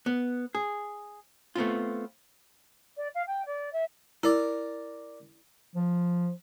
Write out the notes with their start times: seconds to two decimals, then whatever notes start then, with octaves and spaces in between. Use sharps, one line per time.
0.06 B3
0.55 G#4
1.56 A3 B3 C4 F4
2.96 D5
3.14 F5
3.26 G5
3.45 D5
3.72 E5
4.23 E4 A#4 D5
5.76 F3